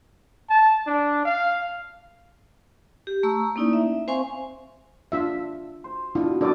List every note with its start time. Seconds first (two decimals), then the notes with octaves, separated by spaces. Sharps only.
0.50 A5
0.87 D4
1.25 F5
3.07 G4
3.23 A3 A#5 C#6 E6
3.56 A#3 C#4 D#4 E4 D5
3.73 E5
4.08 C4 C5 F5 G#5 C6 C#6
5.12 D4 F4 E5
5.84 C5
6.15 B2 D4 E4 F4
6.41 F#2 B2 D4 A4 D5 D6